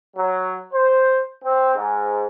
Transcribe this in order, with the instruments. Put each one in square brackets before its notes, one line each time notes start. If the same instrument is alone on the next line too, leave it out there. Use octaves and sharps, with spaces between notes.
[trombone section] F#3
C5
C4
G#2